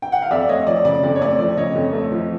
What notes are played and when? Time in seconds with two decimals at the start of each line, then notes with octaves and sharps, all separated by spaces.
0.02 G5
0.12 F#5
0.22 F5
0.31 F2 D5 E5
0.49 A3 C#5 D#5
0.67 F3 D5
0.85 C#3 D5
1.03 F2 D5
1.16 C#5
1.21 A3 D5
1.39 F3 D5
1.57 C#3 C#5 D#5
1.75 F2
1.93 A3
2.12 F3